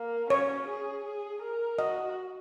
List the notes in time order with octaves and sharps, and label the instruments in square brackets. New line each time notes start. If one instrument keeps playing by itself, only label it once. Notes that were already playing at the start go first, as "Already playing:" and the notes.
Already playing: [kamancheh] A#3
[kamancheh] C#4 [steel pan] C#5
[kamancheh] G#4
G#4
A#4
[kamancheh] F#4 [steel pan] D#5